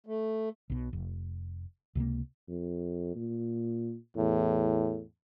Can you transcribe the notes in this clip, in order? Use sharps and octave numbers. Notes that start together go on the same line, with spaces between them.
A3
B1 B2
F1
C#2 C3 A3 A#3
F2
A#2
E2 A2